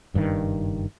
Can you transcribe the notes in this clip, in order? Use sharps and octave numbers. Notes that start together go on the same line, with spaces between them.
F#1 G2 B2 D#3